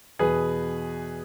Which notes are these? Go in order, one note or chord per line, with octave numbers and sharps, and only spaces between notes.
E2 B2 G#4 B4